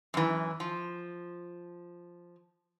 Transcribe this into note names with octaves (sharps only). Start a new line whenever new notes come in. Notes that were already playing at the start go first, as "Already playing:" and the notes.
F#2 E3
F3